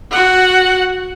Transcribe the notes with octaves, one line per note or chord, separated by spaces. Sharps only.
F#4 F#5